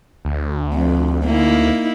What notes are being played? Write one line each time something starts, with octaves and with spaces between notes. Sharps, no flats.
D2
F2
A#3 D#4 E4